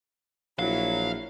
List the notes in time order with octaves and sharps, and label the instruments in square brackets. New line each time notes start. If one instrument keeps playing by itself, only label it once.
[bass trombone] A#1 [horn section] F#3 [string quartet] E4 [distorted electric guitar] F5